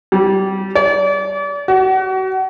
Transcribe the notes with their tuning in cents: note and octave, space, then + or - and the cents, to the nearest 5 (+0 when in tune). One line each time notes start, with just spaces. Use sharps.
G3 -20
D5 -35
F#4 +35